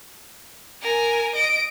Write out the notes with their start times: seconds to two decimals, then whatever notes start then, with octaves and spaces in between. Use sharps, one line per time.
0.82 A#4 G#5
1.35 D#5 D7